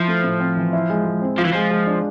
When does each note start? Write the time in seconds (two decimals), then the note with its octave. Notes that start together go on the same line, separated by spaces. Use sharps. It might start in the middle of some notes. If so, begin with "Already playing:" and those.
Already playing: F3 E4
0.08 A3
0.24 A2
0.40 C4
0.57 E3
0.73 E4
0.90 G#3
1.05 G#3
1.22 C4
1.38 F3 F4
1.45 E3
1.53 F3 G#3
1.71 G#3
1.87 D4